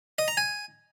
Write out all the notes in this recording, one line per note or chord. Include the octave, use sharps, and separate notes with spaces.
D#5
A#5
G#5